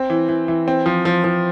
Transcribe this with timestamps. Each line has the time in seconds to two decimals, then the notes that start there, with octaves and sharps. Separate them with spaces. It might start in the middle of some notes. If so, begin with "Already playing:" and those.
Already playing: C4
0.10 E3
0.29 E3
0.48 E3
0.68 C4
0.86 F3
1.05 F3
1.24 F3